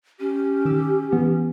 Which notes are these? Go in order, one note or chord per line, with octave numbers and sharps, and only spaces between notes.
C#4 G4
D#3 D6 E6
E3 B3